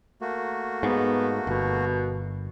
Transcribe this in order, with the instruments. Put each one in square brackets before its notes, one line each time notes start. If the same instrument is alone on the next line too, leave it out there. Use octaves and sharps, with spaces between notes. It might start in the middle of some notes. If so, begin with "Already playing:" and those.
[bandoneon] A3 A#3 F#4
[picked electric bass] G#2 [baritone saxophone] B3
[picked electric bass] G1 [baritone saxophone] B2